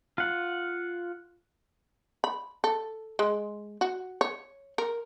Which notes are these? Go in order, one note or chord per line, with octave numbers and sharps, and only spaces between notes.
F4 F#5
B5
A4
G#3
F#4
C#5
A#4